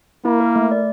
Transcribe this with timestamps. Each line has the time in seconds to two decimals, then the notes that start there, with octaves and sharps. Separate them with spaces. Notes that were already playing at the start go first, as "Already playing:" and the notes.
0.25 A#3 E4
0.40 A#4
0.56 A3
0.71 D5